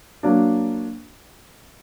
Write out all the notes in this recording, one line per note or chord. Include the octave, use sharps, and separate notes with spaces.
F#3 A#3 D4